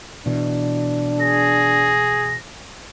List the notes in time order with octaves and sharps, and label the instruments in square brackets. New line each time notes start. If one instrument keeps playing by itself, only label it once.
[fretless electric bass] B2 E3 [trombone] D4
[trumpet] G#4 [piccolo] A#6